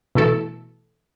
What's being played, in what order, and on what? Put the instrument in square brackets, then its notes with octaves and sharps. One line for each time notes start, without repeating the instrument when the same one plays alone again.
[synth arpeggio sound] B2 E3 A3 E4 A4